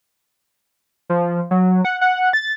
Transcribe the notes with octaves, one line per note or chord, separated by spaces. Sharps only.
F3
F#3
F#5
F#5
A6